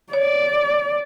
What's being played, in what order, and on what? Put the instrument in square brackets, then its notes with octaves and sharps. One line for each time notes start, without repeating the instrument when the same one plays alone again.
[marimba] C#5 [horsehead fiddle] D5